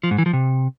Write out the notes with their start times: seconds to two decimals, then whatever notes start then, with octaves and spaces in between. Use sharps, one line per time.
0.04 F3
0.11 G#2
0.18 E3
0.26 F3
0.33 C3